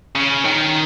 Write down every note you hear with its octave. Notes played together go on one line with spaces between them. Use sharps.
C#3
D#3